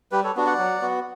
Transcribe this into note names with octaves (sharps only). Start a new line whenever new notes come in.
G3 G4 B4
A4 C#5
B3 D4 F#4
D5 F#5
F#3
B3 F#4